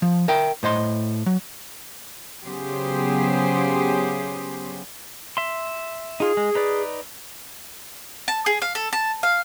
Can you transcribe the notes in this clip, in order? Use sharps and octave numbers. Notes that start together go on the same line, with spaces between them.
F3
A#4 E5 G5
A2 C5 D#5 C6
F#3
C#3 F#3 B3 G4 G#4 C5
E5 C6
D#4 F4 G#4
G#3
D#4 B4 D5
A5
G#4
F5
A4
A5
F5